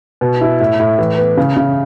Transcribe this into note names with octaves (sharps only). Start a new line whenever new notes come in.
B2
E4
A2
A2
E3
B3
C#3
C#3